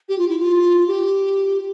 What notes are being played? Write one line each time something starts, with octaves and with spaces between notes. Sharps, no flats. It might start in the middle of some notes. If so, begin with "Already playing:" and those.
G4
F4
E4
F4
G4